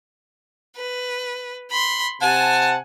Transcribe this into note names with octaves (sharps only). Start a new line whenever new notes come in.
B4
B5 C6
C3 F#5 G#5 A5